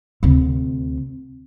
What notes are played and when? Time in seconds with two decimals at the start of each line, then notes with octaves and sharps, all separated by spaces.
0.23 D2 C3